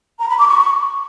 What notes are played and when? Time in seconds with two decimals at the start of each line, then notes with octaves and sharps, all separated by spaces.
0.19 A#5
0.29 B5
0.38 D6
0.48 C#6